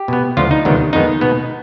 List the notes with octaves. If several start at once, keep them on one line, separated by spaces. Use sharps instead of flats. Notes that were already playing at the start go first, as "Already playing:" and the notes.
Already playing: G4
B2 B3
D2 D3 F3 F4
D#4
D2 C3 D#3 G3 B3
F2 D#3 G#3 B3 D#4
B2 B3